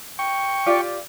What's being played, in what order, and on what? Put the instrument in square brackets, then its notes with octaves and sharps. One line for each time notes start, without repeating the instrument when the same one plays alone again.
[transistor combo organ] G5 C#6
[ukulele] F4 G4 D5